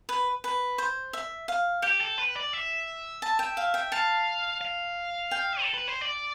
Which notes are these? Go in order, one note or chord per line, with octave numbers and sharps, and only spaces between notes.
B4
B4
C5
E5
F5
G4 G5
A4
B4
D5
E5
A5
G5
F5
G5
F5 A5
F5
G5
A4
B4
C5
D5